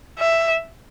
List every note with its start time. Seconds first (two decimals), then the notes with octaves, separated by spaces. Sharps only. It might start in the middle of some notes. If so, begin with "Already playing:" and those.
0.19 E5